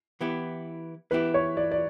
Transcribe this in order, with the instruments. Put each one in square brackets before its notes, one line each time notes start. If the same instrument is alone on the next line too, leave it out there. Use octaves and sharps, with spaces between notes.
[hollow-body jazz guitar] E3 B3 E4 G4
[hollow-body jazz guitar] E3 B3 E4 G4 [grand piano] B4
[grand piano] C#5
D5
D5